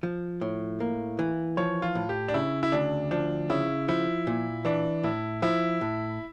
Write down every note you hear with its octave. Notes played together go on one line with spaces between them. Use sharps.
F3
A2
A#3
E3
F3 C#5
F4
A2
G4
D4
C#3 E4
E4
D2 D4
F3 D4
C#3 E4
F3 E4
A#2
E3 D4
A2 E4
F3 E4
A2